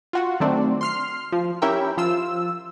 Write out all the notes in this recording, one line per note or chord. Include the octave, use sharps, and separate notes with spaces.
F4 F#4 F#5
D#3 F#3 A3 C4 D4
C6 F6 C7
F3
C#4 E4 G4 A#4 E5 G5
F3 F4 E6